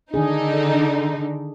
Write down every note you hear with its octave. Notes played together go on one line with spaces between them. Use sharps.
D3 D#3 D4 D#4 G#4